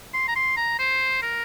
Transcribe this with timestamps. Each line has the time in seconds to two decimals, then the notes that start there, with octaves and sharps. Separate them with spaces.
0.14 C6
0.28 A#5
0.36 C6
0.57 A#5
0.79 C5
1.22 A#4